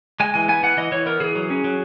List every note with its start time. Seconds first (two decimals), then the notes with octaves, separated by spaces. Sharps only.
0.20 G#3 G#5
0.34 E3 G#5
0.48 B3 G#5
0.63 E3 F#5
0.77 E3 D#5
0.92 E3 C#5
1.06 B3 A#4
1.20 E3 G#4
1.35 F#3
1.50 C#4
1.64 F#3